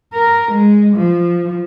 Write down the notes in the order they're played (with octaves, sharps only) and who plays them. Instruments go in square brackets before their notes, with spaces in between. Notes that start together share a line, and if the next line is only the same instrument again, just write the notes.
[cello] A#4
G#3
F3